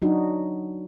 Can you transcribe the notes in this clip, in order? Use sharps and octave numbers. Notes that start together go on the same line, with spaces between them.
F#3 D4 D#4 F#4